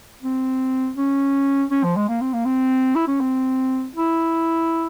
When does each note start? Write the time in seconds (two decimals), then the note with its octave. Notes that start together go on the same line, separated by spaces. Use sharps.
0.23 C4
0.97 C#4
1.71 C#4
1.84 F3
1.96 G#3
2.09 A#3
2.21 C4
2.34 A#3
2.45 C4
2.95 E4
3.08 C#4
3.20 C4
3.95 E4